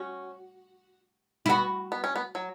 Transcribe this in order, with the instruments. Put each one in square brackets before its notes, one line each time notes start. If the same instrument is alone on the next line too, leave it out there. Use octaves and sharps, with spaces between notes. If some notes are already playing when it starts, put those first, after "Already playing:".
Already playing: [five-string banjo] C#4 [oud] F#4
[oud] E4
[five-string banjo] B3 [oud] F#4
[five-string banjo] B3
C#4
B3
F#3